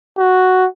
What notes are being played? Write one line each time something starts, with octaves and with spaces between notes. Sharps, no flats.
F#4